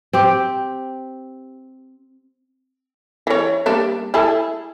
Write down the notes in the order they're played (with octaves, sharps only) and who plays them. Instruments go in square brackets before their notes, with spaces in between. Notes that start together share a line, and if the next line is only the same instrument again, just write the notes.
[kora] C4 G4
[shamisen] E3 C#5
G3 A#3 D4
E4 G#4 A4